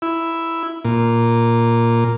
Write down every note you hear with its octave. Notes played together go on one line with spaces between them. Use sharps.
E4
A#2